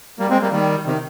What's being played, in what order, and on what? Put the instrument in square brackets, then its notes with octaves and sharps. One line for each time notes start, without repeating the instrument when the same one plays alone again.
[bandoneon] G3 A#3
G#3 C4
G3 A#3
D#3 G3
C3 D#3